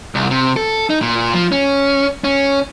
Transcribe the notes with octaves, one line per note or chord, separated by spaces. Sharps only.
C2
C3
A4
D#4
A#2
F3
C#4
C#4